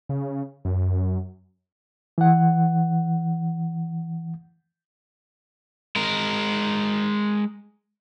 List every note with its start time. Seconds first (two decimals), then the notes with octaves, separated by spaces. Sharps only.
0.09 C#3
0.65 F#2
2.18 E3 F#5
5.96 G#3 A#4